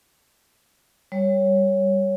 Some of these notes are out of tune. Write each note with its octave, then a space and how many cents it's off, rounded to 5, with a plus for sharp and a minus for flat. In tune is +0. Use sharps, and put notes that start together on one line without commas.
G3 +0 C#5 +0